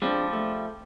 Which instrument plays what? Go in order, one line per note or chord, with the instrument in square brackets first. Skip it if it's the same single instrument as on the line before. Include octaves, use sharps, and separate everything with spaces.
[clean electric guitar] F3 G3 [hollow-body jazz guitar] G#3 C4 D4
[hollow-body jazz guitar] A3